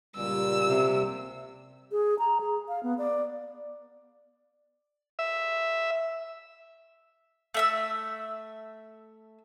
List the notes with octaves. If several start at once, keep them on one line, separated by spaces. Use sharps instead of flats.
C#2 A#2 G3 E6
C3
G#4
A#5
G#4
F5
B3
D5
E5
A3 E5 E6